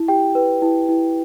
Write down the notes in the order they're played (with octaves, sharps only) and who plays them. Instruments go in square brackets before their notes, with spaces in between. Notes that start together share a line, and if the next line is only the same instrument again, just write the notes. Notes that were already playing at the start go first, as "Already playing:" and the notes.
Already playing: [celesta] E4
G4 G5
B4
E4
E4